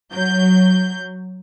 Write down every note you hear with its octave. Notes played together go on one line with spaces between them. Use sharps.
F#3 G6